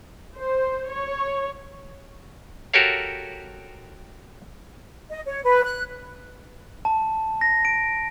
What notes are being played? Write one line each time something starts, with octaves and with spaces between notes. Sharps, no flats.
C5
C#5
F#4 G4 A4 A#4 C#5 F5
D#5
C#5
B4
F#6
A5
A#6
D7